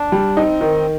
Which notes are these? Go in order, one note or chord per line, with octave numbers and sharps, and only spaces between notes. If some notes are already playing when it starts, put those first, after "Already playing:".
Already playing: D4
G3
C4 D#4
D#3